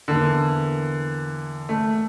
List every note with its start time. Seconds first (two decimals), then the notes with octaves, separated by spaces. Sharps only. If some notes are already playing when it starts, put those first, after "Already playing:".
0.08 E2 D3 E3 A#3 E4
1.69 A3